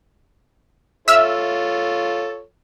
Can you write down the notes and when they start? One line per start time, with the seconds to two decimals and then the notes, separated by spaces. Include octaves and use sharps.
1.08 F4 A4 C#5 E5 E6 F6